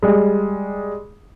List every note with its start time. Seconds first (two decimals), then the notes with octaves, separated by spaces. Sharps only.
0.03 G3 G#3